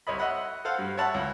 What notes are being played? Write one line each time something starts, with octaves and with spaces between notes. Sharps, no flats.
C2 C#5 D#5 B5
D#5 E5 F#5 B5
A4 C5 F5 F#5
G2
C#5 E5 F#5 A5 B5
C#2